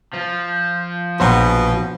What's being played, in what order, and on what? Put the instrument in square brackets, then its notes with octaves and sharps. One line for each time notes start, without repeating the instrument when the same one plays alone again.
[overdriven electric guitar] F3
[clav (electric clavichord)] A#1 F#3 C5 [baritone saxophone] B2